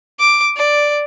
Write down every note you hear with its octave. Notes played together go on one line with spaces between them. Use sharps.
D6
D5